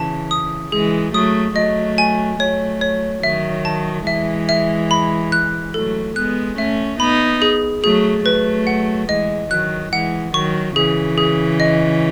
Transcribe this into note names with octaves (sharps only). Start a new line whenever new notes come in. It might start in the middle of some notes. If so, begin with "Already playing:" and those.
Already playing: C#3 E3 A5
D#6
E3 G#3 G#4
F#3 A3 D#6
F#3 A3 D#5
G#5
F#3 A3 C#5
C#5
D#3 F#3 E5
A5
E3 G#3 E5
E5
B5
F#6
F#3 A3 A4
G#3 B3 F#6
A3 C#4 E5
B3 D#4 B5
G#4
F#3 A3 G#4
F#3 A3 B4
F#5
E3 G#3 D#5
D#3 F#3 F#6
E3 G#3 F#5
D#3 F#3 C#6
C#3 E3 G#4
G#4
D#5